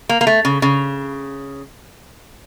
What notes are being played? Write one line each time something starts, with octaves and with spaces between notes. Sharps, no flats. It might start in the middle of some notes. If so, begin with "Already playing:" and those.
A#3
A#3
A3
C#3
C#3